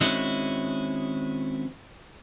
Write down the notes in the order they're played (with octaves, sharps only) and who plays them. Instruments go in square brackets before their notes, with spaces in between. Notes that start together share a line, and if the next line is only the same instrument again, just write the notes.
[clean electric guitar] D#3 G#3 C4 C#4 E4 F#4